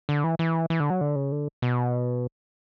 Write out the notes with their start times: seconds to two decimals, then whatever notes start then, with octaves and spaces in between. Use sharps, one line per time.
0.09 D3
0.24 E3
0.39 E3
0.70 E3
0.80 D3
0.90 F#3
1.01 D3
1.16 C#3
1.32 D3
1.62 B2